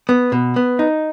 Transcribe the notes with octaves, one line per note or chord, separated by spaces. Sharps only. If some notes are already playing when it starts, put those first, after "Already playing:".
B3
B2
B3
D#4